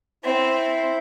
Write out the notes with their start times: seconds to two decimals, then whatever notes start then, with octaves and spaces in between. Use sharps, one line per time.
0.24 C4 E4 C5